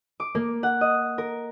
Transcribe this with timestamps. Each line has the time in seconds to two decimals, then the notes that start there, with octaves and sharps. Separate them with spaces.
0.20 D6
0.35 A#3
0.63 F#5
0.81 D#5
1.18 A#4